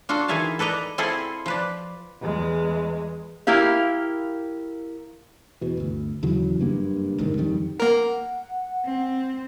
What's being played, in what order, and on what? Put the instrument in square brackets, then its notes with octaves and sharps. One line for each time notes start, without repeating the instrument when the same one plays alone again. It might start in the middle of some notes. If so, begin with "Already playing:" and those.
[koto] D4 F4 F#4 A4
D#3 E3 G#4 E5 F5 A5
A4 B4 D5 D#5 A#5
C4 E4 F4 G#4 A4
F3 B4 D5
[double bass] E2 G#3
[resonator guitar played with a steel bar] A#3 E4 G4 F5
[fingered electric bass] E2 B2
G1 D2
D#2 C#3 E3 F#3
F#1 G2 A#3
G1 C#2 G#2 D#3
D#1 F2 D#3 G3
[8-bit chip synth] A#3 A#4 [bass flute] F#5
[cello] C4